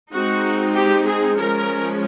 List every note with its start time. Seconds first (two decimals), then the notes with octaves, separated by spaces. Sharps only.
0.13 G#3 C4 D#4 F#4
0.75 G4
1.07 G#4
1.37 F3 G#3 C#4 A#4